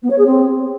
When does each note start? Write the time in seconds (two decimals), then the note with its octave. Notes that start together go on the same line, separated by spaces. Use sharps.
0.02 B3
0.10 C#5
0.18 G#4
0.26 C4